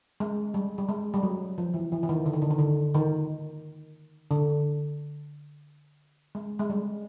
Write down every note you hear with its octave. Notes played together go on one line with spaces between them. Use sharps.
G#3
G3
G3
G#3
G3
F#3
F3
E3
E3
E3
D#3
D3
D#3
D3
D#3
D3
D#3
D3
G#3
G#3
G3